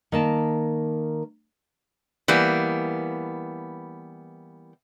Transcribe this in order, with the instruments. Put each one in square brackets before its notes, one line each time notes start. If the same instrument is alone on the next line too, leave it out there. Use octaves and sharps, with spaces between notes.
[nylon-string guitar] D#3 A#3 A5
[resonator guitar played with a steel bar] E3 G3 A#3 B3